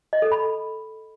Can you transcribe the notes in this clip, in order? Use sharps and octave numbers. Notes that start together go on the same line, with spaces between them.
D#5
A4
B5